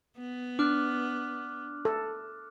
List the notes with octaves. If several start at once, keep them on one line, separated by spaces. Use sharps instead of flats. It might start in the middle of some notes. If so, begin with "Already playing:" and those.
B3
D4 D6 F6 F#6
A4